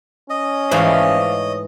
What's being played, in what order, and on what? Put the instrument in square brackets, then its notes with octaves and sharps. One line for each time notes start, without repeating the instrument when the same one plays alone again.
[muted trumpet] C#4 [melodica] D#5
[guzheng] G#2 E3 A3 [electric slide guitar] C5 D5 F5
[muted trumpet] C#5